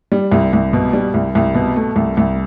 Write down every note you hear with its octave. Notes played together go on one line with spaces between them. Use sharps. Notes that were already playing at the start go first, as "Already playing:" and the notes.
G3
C2
C2
B2
G3
C2
C2
B2
A3
C2
C2